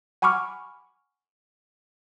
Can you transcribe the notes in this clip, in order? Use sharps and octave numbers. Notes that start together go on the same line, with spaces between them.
F#5 G#5 B5 C#6 D6 F6